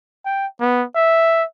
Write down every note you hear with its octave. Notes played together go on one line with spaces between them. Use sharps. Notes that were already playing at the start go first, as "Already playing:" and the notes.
G5
B3
E5